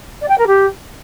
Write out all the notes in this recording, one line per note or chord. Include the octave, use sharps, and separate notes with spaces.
D5
G5
A#4
G4